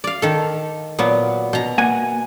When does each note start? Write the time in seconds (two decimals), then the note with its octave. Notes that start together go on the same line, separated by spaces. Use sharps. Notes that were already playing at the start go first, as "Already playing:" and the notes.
0.04 D5 F5
0.22 D#3 A4
0.99 A#2 F#3 B3
1.53 B2 A#5
1.78 A#3 F#5 G#5